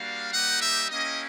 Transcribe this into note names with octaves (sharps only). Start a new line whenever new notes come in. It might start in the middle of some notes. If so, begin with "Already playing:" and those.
Already playing: G3 A#3 D4 F#4 F5
G3 A#3 D#4 G4 F#5
E5
A#3 C#4 E4 G4 D#5